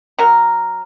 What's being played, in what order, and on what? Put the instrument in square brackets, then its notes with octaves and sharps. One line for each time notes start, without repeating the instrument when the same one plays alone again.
[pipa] F#3 A#4